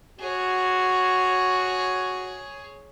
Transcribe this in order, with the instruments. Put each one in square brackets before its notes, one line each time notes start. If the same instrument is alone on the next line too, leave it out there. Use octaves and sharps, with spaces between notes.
[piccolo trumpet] F#4 [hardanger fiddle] G#4 C#5